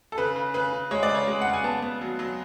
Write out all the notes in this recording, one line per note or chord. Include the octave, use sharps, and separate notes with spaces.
A4
C#3 B4
C#3
C#3 B4
C#3
G#3 C#5
D5
C#3
C#5
G#3
C#3 F#5
G#5
B3 A5
B3
F#3
F#3